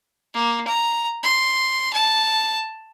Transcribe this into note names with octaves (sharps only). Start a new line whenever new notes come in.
A#3
A#5
C6
A5